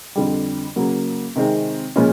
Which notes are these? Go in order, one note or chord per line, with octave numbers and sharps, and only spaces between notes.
F2 D3 G3
C#3 F#3 A#3
C3 D#3 G#3 C4
A#2 F3 G#3 C#4 F4